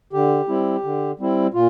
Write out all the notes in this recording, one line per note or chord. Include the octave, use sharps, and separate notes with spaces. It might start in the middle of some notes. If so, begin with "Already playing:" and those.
D3 G4
G3 C4 E4
D3
G3 C4 E4
A#2 F4